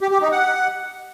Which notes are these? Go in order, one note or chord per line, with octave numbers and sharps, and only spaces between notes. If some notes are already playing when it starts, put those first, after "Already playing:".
G4
G4
D#4
F#5